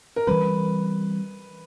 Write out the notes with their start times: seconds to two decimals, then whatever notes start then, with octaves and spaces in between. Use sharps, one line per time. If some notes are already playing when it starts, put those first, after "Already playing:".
0.16 A#4
0.27 E3 G3 C4 B4